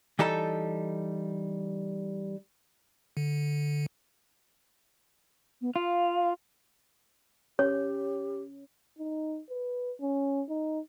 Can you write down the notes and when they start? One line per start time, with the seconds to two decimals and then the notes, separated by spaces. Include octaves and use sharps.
0.19 E3 G3 D#4 A4 A5
3.17 D3
5.62 B3
5.76 F4 F5
7.59 C#4 G4 C#5
8.99 D#4
9.50 B4
10.01 C#4
10.49 D#4